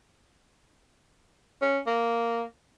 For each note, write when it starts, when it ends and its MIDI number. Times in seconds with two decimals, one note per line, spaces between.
1.62 1.78 61
1.87 2.43 58